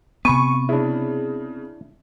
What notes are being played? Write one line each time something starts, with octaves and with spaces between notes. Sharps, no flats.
C3 B3 G#5 B5 C#6 D#7
C#3 D4 E4